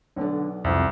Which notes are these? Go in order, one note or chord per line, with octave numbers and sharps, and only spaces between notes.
B1 D3 B3 D5
C2 F2